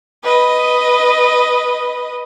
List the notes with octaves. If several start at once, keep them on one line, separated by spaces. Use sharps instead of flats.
B4 D#5